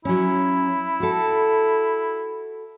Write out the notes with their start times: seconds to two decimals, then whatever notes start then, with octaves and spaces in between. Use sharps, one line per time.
0.05 F#3 C#4 E4
1.00 F#4 A4